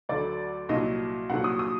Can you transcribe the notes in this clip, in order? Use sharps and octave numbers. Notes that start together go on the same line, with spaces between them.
D2 D3 F#3 A3 D5
C2 A#2 F#3 D#5
C2 A#2 F#3 F#5
D#6
D#6